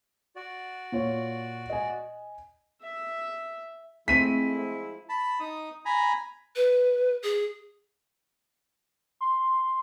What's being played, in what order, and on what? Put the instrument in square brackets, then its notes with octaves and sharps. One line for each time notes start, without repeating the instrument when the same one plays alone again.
[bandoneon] F#4 D5
[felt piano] A#2 F4 C#5
D#5 G#5
[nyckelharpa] E5
[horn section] F3 G#3 E4 [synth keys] A3 C4 [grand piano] B6 D#7
[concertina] A5 B5
D#4 D#6
G#5 A#5 B5
[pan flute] B4
G#4
[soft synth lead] C6